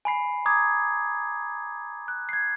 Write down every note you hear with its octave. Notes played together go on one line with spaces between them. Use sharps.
G#5 B5 C7
A#5 D6 D#6 G#6
F#6
G#6 C7